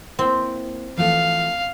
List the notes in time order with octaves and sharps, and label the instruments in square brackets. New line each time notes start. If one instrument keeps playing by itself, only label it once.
[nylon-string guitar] A#3 E4 [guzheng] C4
[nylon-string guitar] E3 F3 A3 [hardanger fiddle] F5